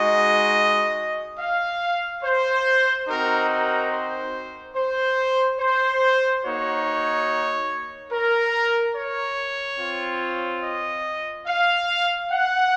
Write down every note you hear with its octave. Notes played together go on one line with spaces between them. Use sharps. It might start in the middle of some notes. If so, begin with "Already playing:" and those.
Already playing: G#3 D#4 F#4 D#5
F5
C5
C4 D#4 F#4 A#4
A#4
C5
C5
C5
A#3 D#4 F#4 C#5
A#4
C#5
C4 F4
D#5
F5
F#5